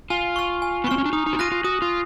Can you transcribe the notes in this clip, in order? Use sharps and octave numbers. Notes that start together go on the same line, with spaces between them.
F4 G#5
C#6 F6
G#5
B3
C4 C#6 F6
C#4
D4
D#4 D#6
D#4
F#4
F4 F#6 A#6 D#7
F4
F#4 D#6
F4